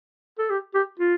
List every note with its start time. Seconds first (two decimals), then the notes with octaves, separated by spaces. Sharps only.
0.38 A4
0.50 G4
0.74 G4
1.00 F4